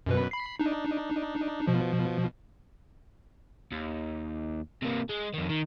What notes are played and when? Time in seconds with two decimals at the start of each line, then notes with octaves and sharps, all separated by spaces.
0.06 F#2 B2 B4
0.31 B5 C7
0.59 D4 D#4
1.67 B2 F3
3.72 D#2
4.82 C3 A#3
5.09 G#3
5.34 F2 D#3
5.50 D#3